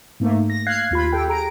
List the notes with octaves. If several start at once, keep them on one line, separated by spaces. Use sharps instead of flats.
G#2 A3 A#3
A#6
F5 F#6 G#6 C7
D#2 F4 B5
G4 A4 G5
G#4 A#5 D7